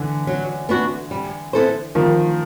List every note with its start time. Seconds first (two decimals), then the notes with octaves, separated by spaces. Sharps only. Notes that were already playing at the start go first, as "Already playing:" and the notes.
Already playing: D3 E3
0.27 F#3
0.69 B3 D4 F#4
1.11 G3
1.53 B3 E4 A4 C5
1.95 D#3 F3 G3